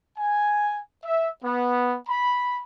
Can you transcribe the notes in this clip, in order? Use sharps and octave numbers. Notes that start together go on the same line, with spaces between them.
G#5
E5
B3
B5